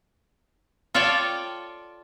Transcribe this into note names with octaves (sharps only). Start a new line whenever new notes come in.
F4 A4 C#5 D5 F5 G5